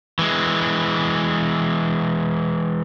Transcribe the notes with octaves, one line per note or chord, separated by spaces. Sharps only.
E3 G#3